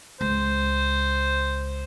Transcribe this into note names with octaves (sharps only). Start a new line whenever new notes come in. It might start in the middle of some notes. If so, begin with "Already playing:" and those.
C#2 C5